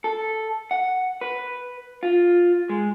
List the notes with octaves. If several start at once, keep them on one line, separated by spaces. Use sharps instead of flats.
A4
F#5
B4
F4
G#3